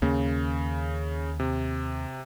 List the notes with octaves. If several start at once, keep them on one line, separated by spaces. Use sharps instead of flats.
D#2 C#3 A#3
C3